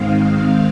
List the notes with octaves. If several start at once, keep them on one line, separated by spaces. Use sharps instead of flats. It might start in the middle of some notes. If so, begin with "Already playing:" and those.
Already playing: G#2 D#3 G#3 C4 F5